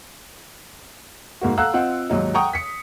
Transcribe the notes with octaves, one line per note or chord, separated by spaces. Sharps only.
G#2 A#3 F#4
A4 F5 F#5 A#5 E6 F#6
C4 F4 D#5 F#5
D#2 G#2 F#3 D#4
F#5 G5 A#5 C#6 D#6
B6 C#7